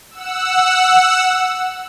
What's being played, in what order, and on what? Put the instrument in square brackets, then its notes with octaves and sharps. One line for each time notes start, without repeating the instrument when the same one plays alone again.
[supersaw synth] F#5 E6